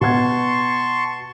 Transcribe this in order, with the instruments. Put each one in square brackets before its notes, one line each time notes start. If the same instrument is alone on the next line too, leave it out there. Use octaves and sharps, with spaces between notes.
[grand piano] B2 F#5 G#6 [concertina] A5 C6 C#6